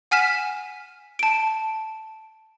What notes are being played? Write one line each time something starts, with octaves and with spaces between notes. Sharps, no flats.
F#5 G#5 F6 B6 E7
A5 D7